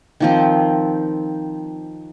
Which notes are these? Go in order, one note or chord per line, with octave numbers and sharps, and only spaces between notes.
D#3 F3 C4